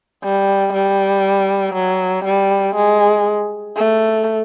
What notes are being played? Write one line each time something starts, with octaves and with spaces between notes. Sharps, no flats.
G3
G3
F#3
G3
G#3
A3